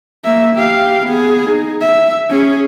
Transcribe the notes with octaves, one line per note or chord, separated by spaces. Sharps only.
A#3 E5
G4 F5
B3 G#4
D#4
E5
C#4 G#4